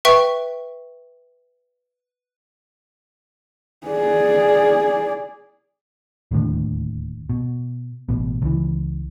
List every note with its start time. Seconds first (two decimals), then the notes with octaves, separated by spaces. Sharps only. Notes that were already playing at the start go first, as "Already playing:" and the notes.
0.05 B4 E5 G5 C#6
3.87 G#4 D5
6.31 D1 D#2 A2 D3
7.29 B2
8.09 A1 B2
8.42 C#2 E3